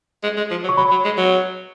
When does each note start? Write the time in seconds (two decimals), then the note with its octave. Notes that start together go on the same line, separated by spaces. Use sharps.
0.23 G#3
0.37 G#3
0.51 F3
0.64 F#3
0.69 C#6
0.77 F#3 B5
0.91 F#3
1.05 G#3
1.18 F#3